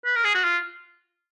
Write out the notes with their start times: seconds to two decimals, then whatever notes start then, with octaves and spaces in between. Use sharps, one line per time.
0.05 B4
0.16 A#4
0.25 G#4
0.35 F#4
0.44 F4